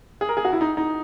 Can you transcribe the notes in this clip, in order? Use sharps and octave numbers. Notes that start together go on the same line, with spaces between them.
G#4
A#4
G#4
F#4
E4
D#4
D#4